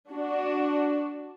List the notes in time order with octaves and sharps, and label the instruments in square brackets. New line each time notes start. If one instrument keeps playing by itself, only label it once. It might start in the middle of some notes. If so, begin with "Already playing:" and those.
[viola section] D4 F#4